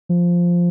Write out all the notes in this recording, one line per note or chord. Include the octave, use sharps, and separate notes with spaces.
F3